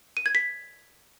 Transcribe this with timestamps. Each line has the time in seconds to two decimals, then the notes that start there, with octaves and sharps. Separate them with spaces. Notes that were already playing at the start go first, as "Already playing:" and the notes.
0.17 D#7
0.26 G#6
0.35 B6